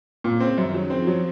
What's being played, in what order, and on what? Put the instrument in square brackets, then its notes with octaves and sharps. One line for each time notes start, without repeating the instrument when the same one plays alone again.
[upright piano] A#2 [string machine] C#3
[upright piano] C4
[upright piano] F#2 [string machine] D#3
[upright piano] F#3
[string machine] F3 [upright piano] C4
[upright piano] F#3